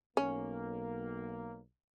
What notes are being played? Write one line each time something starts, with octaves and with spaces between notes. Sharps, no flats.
B1 A#3 C#4